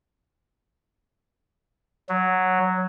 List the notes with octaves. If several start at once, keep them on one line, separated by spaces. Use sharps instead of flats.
F#3